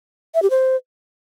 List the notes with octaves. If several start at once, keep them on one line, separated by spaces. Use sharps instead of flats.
E5
G4
C5